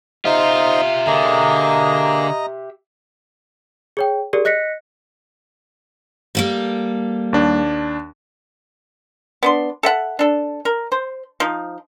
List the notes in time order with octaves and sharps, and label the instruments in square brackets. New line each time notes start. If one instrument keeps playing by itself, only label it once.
[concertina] D#4 C5 D#5 [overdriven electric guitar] F4 [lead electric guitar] G4 E5
[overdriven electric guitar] D3 [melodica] A#3 G#4 [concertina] D#5 A#5
[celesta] G#4 C#5 G5
G4 G#4 A#4 D5
D#5 F#6 A#6 B6 C#7
[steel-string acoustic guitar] G3 A#3 A4
[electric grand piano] D#2 D4
[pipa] B3 D4 C6
A4 E5 F#5
D4 A4
A#4
C5
F3 D#4